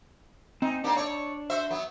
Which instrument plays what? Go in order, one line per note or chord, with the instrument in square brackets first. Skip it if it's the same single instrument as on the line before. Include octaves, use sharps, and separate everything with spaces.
[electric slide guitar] C4 G#5 [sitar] D#4
[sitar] A#3 C4 G4 [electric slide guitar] D4
[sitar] C#5 D5
F#4 C5 E5
F#3 B3